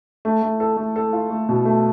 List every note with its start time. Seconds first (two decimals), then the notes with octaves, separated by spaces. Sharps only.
0.25 A3
0.42 A3
0.60 A4
0.77 A3
0.96 A4
1.13 F4
1.30 A3
1.49 B2
1.65 A3